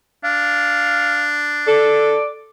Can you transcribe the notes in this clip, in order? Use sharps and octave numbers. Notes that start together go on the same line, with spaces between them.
D4 F5
A4 D5